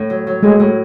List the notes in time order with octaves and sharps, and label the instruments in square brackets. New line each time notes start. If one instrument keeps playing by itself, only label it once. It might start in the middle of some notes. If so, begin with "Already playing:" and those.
Already playing: [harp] A2
F#3
F#3
[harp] A2 [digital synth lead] G#3
[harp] A2